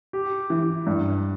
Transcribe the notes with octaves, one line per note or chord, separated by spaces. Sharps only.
G4
E3
G2